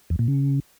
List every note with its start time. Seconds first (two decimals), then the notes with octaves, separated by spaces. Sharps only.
0.10 E2
0.19 A#2
0.28 C#3